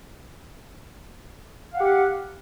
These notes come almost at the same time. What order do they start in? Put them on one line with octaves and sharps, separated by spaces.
F5 F#5 G4